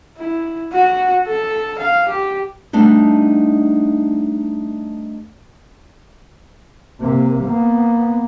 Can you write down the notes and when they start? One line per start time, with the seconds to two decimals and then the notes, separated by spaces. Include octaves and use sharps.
0.18 E4
0.72 F#4
1.27 A4
1.79 F5
2.08 G4
2.73 G3 A3 B3 D4 D#4
7.01 C3 A#3
7.45 A#3 B3